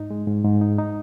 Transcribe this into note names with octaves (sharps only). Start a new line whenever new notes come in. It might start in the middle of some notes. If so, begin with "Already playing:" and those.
Already playing: G#2 D#4
G#3
G#2
G#2
D#4
D#4